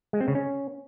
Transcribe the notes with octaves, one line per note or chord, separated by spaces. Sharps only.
G#3
C4
C#3
C#4